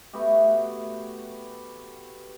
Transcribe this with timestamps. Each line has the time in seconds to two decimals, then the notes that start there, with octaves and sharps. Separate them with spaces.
0.13 A3 B3 F#4 G4